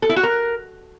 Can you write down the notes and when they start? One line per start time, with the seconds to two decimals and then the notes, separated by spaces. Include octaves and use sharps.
0.02 A4
0.09 E4
0.16 F#4
0.23 A#4